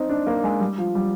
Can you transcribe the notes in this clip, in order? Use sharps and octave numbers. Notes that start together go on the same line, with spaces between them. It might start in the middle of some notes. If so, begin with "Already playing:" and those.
Already playing: C4 D#4
D4
A#3
G#3
G3
F3
G3